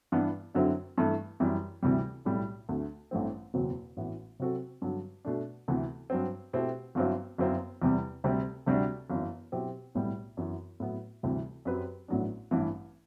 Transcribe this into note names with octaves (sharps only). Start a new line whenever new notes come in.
G2 E3 B3 D4
F#2 D3 F#3 C4 E4
G2 E3 A3
F#2 E3 G3
D2 C3 E3 G3
B1 A2 G3
D2 D3 A3
A1 G2 E3 A3 C4
F#1 E2 B2 F#3 C4
A1 A2 E3 B3 F#4
C3 F#3 C4 F#4 A4
G2 D3 F#3
B2 A3 D4
D2 C3 E3 B3
G2 F#3 C4
B2 A3 C4 E4 G4
G1 G2 F#3 C4 E4
G1 F#2 F#3 C4 E4
E2 C3 G3
D2 C3 G3 C4
D2 C3 G3 D4 F#4
G1 F#2 E3
B2 F#3 C4 E4 G4
B1 A2 G3 B3
F#2 E3 B3 F#4
A2 F#3 B3 E4
D2 C3 E3 G3
F#2 F#3 C4 G4 B4
A1 A2 F#3 B3 D4
A1 G2 E3